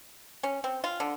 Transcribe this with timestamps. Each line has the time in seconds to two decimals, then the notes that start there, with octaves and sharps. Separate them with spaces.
0.43 C#4
0.64 C4
0.84 F4
1.00 D3